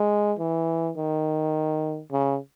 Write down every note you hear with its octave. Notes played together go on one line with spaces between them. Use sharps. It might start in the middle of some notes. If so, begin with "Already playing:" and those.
Already playing: G#3
E3
D#3
C#3